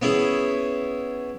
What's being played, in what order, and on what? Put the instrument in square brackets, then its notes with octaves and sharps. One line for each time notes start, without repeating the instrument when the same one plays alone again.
[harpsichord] B3 C#4 E4 G#4